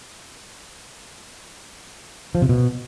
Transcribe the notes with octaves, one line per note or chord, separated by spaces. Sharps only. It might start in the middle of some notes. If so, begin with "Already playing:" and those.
F3
C3
B2